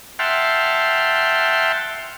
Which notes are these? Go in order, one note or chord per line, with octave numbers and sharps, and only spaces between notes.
E5 F#5 G5 A5 C6 F6